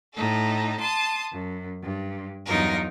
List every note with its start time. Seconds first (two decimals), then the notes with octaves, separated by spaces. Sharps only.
0.13 A2 D#4 A4
0.78 A5 C6 D#6
1.32 F#2
1.83 G2
2.46 E2 G2 F#3 D#4 F4 A#4